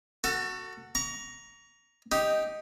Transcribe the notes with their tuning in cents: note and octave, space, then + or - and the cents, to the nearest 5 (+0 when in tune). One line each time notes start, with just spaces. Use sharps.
F#4 +0 A4 +30
A#5 +5 C#6 +35
D#4 +0 G4 +0